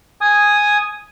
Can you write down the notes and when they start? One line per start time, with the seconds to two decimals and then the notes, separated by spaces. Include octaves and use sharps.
0.21 G#5 D#6